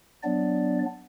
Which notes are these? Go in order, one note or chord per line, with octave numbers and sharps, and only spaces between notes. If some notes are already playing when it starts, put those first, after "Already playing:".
F#3 B3 D4 D5